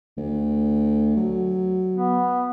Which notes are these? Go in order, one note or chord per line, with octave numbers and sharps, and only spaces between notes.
D2
F#3
B3